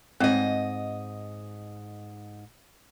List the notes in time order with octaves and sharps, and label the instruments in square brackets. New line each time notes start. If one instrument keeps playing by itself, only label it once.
[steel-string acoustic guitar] G#2 D#5 [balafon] C4